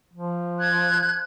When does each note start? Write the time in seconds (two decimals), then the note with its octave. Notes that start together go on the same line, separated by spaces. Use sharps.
0.13 F3
0.60 F#6 G#6